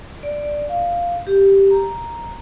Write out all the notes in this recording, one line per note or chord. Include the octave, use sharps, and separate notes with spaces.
D5
F5
G4
A#5